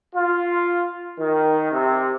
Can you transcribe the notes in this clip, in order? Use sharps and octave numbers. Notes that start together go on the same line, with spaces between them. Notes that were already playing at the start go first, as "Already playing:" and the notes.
F4
D#3
C3